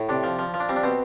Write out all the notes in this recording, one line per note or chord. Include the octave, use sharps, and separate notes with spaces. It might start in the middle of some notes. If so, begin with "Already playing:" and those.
Already playing: A2
C3 D4
F3
F3
F3
D4
G3 C4
D4
B2 C4